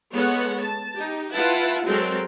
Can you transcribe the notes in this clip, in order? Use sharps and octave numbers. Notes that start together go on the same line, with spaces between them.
G#3 B3 A4 C#5 F#5
A5
D#4 G4
E4 F4 B4 F#5 A5
F#3 G#3 C4 A4 A#4